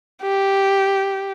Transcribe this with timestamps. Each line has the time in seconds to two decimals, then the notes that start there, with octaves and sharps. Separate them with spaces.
0.23 G4